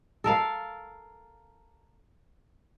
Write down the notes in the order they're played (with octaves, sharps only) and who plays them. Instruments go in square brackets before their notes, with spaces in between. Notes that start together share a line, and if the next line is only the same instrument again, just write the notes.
[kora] A4 A#4 F5